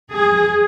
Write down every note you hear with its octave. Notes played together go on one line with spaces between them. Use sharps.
G#4